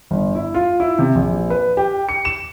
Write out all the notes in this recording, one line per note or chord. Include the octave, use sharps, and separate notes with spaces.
G1
E4
F4
E4
C3
A#1
B4
G4
C#7
E7